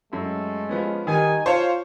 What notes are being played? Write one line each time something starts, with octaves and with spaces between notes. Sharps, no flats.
F#2 G#3 A3
F3 B3 C#4
D#3 G3 D#4 G#5
F4 C5 C#5 F5 A5 C#6